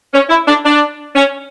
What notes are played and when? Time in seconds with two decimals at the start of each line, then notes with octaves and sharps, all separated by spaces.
0.14 C#4
0.30 E4
0.47 D4
0.65 D4
1.15 C#4